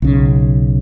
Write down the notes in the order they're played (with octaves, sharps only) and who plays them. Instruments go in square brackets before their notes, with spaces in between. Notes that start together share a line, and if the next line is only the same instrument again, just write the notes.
[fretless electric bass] B1 C#3